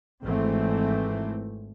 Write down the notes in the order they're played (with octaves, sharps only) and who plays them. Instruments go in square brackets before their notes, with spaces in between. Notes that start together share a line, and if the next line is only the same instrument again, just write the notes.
[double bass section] G#1 E3 A3 C4